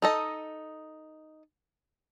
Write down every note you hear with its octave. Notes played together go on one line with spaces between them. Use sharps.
D#4 A4 D#5